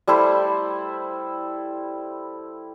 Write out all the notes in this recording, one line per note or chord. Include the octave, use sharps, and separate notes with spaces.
G3 A3 E4 C5